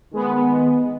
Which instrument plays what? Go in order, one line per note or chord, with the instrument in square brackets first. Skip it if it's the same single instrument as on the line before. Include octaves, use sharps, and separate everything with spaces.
[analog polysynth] D#3 G#3 B3